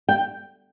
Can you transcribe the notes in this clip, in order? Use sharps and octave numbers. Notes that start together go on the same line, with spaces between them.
G5